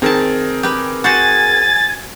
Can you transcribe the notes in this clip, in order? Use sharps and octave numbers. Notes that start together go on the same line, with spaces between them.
D#3 C4 G#4 A#4 A5
G4 B4
F#4 C5 F#5 G#5 G#6 A6